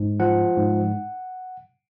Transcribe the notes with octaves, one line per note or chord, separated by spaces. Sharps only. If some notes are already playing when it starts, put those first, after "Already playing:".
Already playing: G#2
F3 F#5
G#2